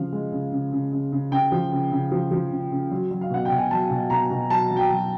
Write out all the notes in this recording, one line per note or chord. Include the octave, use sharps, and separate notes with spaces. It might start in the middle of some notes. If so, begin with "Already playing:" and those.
Already playing: C#3 F3 F5
G#3
C#3
C#3
C#3
C#3
C#3
C#3 G5
F3
C#3
C#3
F3
F3
C#3
C#3
F#3
F#3
F5
B2 F#5
G5
B2
G#5
F#3 A5
B2
B2 A#5
B2
F#3 A5
F#3
G5
F#3